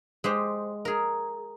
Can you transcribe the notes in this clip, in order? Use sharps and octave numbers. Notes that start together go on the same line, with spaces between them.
G#3 G4 C5
G#4 A#4